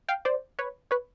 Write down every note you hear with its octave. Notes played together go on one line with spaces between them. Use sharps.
F5 G5
C5 D5
B4 C#5
B4 C#5